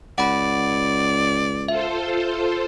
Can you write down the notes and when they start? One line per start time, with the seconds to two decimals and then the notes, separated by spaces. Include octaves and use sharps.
0.18 C#2 D5 F#5 B5
1.68 F4 A4 C5 E5